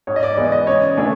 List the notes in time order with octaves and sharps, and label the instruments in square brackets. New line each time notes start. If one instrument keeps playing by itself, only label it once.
[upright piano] G#2 [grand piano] C#5
[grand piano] D#5
D5
[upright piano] E3 G#3 B3 [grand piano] D5
[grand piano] D#5
[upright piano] C#3 [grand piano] C#5
[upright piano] E3 A3 D4